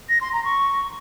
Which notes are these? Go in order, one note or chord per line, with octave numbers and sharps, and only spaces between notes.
A#6
C6
A#5
C#6